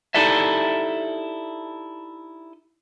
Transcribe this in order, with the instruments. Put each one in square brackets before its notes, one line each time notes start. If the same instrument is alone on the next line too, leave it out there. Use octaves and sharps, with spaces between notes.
[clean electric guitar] D#4 E4 G4 A4 D5 E5